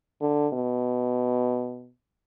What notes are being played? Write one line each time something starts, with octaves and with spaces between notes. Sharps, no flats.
D3
B2